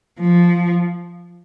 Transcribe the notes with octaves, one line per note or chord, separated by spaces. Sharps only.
F3